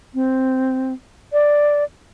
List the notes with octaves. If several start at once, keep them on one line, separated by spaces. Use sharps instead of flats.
C4
D5